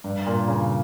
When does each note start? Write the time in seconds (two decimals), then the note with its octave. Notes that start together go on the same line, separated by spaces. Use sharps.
0.04 G2
0.26 A#2
0.48 C#3